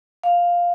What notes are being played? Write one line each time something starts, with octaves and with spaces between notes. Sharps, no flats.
F5